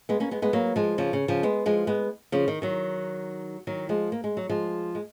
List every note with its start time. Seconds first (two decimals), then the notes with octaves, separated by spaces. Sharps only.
0.09 G#3 B3
0.20 A#3 C#4
0.31 G#3 B3
0.42 G#3 B3
0.53 F#3 A#3
0.76 F3 G#3
0.98 C#3 F3
1.13 C#3
1.28 C#3 F3
1.43 G#3 B3
1.66 F3 G#3
1.87 G#3 B3
2.32 C#3 F3
2.48 D#3
2.62 D#3 F#3
3.67 D#3 F#3
3.89 F3 G#3
4.12 A#3
4.24 G#3
4.37 F#3
4.49 F3 G#3
4.95 G#3